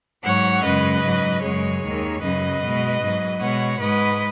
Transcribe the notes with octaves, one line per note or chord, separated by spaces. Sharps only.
G#2 F#3 C#5 F#5
F#2 C#3 G#3 B4 D#5
G#2 F#3
F#2 C#3 G#3 G#4 C#5
D#2 D#3 G#3
F#2 C#3 F#3 B4 D#5
B2 G#3
G#2 F#3
B2 G#3 C#5 F#5
G#2 G#3 B4 D#5